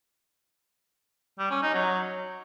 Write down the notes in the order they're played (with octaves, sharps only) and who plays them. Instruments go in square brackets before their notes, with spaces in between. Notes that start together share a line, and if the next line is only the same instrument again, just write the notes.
[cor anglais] G3
C#4
D#4
F#3